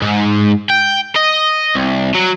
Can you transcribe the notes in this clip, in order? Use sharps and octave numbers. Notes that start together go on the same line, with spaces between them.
G#2
G5
D#5
C2
F#3